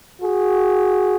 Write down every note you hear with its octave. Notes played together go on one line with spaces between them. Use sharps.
F#4 G#4